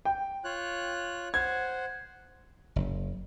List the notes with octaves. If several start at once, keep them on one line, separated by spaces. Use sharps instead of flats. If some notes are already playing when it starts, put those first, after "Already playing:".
G5
F4 C#5 F#6
C5 F#5 G#6
F#1